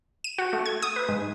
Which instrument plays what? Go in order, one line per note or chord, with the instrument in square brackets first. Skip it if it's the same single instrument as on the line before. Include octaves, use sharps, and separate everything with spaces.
[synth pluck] D#7
F#4
A3
G#6
D#6
B4
G#2